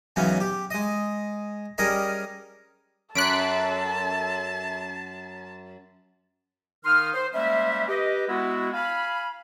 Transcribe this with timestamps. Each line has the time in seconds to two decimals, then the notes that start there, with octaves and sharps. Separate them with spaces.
0.16 G#2 C#3 E3 F#3 B3 C#4
0.40 G4
0.70 G#3 D#5
1.78 G3 C#4 G#4 A#4 D#5
3.15 F#2 A4 A5 F#6 B6 D7
6.85 D#3 D#4 F5 C6 D#6 F6
7.14 C5
7.34 G3 G#3 A#3 C#4 C5 E5
7.88 G4 B4 D#5
8.28 G#3 B3 E4 F#4
8.73 F5 G#5 B5